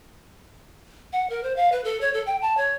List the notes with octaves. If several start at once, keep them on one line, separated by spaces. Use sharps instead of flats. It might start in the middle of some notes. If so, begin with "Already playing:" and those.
F#5
A#4
C5
F5
B4
A4
C#5
A4
G5
A5
C#5